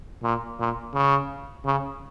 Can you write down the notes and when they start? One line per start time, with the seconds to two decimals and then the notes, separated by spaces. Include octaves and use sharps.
0.23 A#2
0.59 A#2
0.94 C#3
1.65 C#3